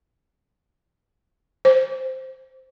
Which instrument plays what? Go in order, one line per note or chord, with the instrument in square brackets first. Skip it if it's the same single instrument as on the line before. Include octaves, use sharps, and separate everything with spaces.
[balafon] C5